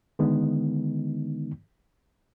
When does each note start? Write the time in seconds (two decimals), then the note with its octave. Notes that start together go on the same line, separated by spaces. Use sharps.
0.19 D3 D#3 G#3 B3 D#4